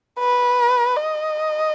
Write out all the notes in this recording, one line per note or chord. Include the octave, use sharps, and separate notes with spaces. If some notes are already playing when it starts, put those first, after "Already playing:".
B4
D#5